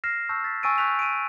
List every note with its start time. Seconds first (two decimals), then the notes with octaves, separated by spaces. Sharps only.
0.04 F6 A#6 C7 E7
0.29 A5 C#6 E6 G6
0.44 A6 B6
0.63 G#5 C#6 E6 A6 D7 D#7
0.78 C#6 D#6 F#6 G6 B6 F7
0.99 D7 D#7